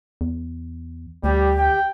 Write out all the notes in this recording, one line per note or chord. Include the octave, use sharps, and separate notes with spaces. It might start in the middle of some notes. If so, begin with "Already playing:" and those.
E2
D2 G3 G4
G5